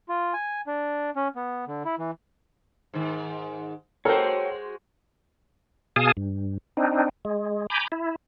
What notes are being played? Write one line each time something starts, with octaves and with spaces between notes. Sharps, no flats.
F4
G#5
D4
C#4
B3
D3
E4
E3
G#2 D#3
G#3 F#4 A4 A#4 C5 C#5 G5
B2 G#4 F5 G#5 A5 D#6
G2
C4 D4 D#4
G#3
G#5 A#5 B5 D6 G6
E4